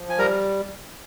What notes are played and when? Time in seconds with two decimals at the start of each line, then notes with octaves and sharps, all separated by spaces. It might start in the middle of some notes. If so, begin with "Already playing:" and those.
Already playing: F3
0.09 G#5
0.18 G3 A#4 A#5